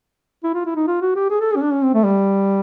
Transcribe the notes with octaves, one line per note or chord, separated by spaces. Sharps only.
E4
F4
E4
D#4
F4
F#4
G4
G#4
A4
G#4
C#4
D4
C#4
C4
A3
G3